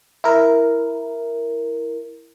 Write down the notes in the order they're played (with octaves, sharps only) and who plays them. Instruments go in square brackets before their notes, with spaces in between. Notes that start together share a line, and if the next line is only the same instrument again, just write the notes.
[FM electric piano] E4 A#4